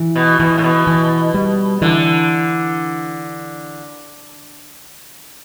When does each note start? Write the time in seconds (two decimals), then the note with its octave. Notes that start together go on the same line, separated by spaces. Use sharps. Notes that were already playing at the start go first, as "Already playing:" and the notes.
Already playing: E3
0.15 B2
0.40 B2 E3
0.58 A2
0.64 B2
0.87 E3
1.34 G3
1.82 D3 E3